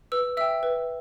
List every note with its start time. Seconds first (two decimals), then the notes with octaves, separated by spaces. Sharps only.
0.12 B4 E6
0.37 E5 G5 E6
0.63 B4